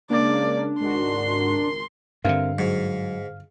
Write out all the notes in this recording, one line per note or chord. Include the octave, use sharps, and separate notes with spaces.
C#3 G#3 A#3 D4 D5
G#1 C#2 G#2 F#4 A#4 C6
G2 D3 C4 A#4 E5 F5
G#2 F#3